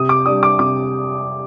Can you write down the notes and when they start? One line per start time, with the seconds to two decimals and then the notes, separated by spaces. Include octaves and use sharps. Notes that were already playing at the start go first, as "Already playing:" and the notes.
Already playing: C3 D#6
0.09 D6
0.26 G3 D4 D#6
0.43 D6
0.59 C3 D6